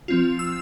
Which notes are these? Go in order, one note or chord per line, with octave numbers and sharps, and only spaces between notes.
F3 C4 F4
E6